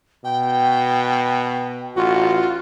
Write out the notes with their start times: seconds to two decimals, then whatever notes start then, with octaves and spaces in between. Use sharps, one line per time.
0.24 B2 G5
1.96 A1 F4 F#4